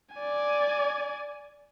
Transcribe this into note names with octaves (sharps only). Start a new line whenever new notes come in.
D5 G#5